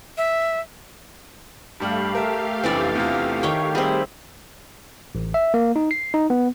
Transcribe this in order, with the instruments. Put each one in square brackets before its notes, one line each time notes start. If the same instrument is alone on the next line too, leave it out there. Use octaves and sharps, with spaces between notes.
[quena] E5
[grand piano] G2 G3 [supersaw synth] A3 G4 F5
[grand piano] A#4 E5 A5
[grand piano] F1 C#2 C4 [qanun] E3 D4 D5
[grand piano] E2 C3 F4
[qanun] D#3 C#5 G5 [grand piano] C#6
[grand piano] G3 [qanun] C4 G#4 [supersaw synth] G4 E5
[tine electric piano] A1
E5
A#3
D#4
C7
D#4
B3